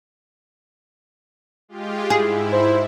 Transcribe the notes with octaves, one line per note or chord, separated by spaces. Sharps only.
G#3 F4 G4
G#2 E4 G#4
C5